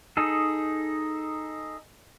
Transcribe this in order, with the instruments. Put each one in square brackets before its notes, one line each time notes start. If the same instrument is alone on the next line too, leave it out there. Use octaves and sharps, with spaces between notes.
[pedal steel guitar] D#4 G#4 A4